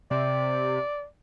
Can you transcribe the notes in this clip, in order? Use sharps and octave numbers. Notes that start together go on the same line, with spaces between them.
C3 D5